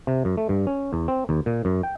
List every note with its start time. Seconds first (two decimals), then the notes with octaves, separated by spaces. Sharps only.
0.07 C3
0.25 F#2
0.37 A3
0.49 G2
0.67 C#4
0.93 E2
1.08 C4
1.29 D#2
1.46 A#2
1.65 F#2
1.83 G5